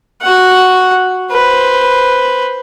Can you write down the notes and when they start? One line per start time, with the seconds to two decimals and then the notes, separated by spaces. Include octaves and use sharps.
0.22 F#4 F#5
1.32 B4 C5